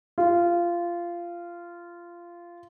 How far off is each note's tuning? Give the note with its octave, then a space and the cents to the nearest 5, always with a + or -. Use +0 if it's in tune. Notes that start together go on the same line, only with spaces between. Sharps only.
F4 -15